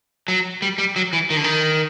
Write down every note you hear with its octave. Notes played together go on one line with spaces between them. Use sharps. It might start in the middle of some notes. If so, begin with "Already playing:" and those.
F#3
G3
G3
F#3
E3
D#3
D3
D#3